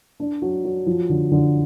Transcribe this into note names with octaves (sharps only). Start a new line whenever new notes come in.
D4
F#3
F#3
F3
D3
D3